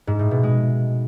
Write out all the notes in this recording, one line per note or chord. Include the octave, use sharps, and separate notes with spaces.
G#2
A2
B2
G#3